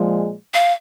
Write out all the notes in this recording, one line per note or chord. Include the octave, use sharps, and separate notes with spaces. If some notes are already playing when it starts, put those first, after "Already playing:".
Already playing: A#2 F3 G#3
F5